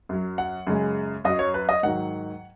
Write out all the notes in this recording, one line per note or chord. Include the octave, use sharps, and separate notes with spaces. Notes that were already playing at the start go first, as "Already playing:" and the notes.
F#2 F#3
F#5
F#2 C#3 G#3
F#2 F#3 D#5
C#5
B4
D#5
G#2 D#3 F#3 F#5